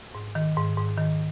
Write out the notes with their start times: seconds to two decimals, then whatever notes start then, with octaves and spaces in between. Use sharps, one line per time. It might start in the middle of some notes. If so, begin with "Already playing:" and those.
0.15 G#2
0.35 D#3
0.57 G#2
0.78 G#2
0.97 D#3